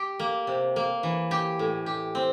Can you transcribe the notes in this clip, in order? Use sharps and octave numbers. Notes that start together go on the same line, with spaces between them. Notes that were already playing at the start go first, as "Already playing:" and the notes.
Already playing: G4
A#3
C3
A#3
E3
G4
A2
G4
C4